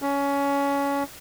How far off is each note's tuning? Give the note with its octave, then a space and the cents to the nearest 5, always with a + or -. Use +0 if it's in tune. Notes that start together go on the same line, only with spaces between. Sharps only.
C#4 +20